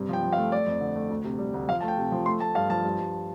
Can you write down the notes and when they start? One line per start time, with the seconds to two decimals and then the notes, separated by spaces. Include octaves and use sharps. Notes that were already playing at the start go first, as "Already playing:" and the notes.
Already playing: G2 C3
0.09 F3 G5
0.23 F3
0.33 F5
0.37 A3
0.52 A3 D5
0.66 F2
0.81 D3
0.96 A3
1.10 D2
1.24 C3
1.39 G3
1.54 D2
1.68 F3 F5
1.81 A3 A5
1.88 G5
1.97 C3
2.12 F3
2.26 A3 C6
2.40 A3 A5
2.55 G2 F5
2.70 F3 A5
2.84 G2
2.99 G2